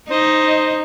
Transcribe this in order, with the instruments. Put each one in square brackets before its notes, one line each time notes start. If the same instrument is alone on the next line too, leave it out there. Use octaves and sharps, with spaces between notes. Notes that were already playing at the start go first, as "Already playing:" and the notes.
[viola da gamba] D#4 [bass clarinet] C5 [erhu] D#5